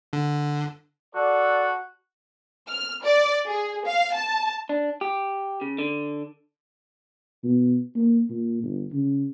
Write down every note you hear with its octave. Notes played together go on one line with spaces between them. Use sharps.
D3
F#4 A4 D5
F6
D5
G#4
F5
A5
D4
G4
C#3
D3
B2
A#3
A#2
G1
C#3